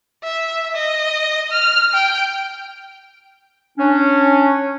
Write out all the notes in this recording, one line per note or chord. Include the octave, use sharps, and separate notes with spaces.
E5
D#5
F6
G5
C#4 D4